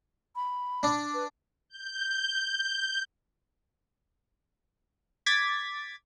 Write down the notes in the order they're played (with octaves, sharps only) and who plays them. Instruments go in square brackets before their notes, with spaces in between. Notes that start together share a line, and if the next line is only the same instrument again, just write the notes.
[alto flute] B5
[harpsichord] D4
[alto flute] B4
[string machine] G6
[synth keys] D6 G#6 A6 B6